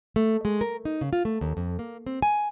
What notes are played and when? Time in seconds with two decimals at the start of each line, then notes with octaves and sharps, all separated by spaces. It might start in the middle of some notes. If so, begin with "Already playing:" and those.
0.16 A3
0.45 G#3
0.61 A#4
0.85 D#4
1.01 C#3
1.13 F4
1.25 A3
1.41 D#2
1.57 F2
1.79 A#3
2.06 C4
2.22 G#5